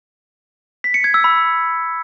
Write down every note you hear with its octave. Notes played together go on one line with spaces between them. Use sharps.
B6
C#7
G#6
E6
B5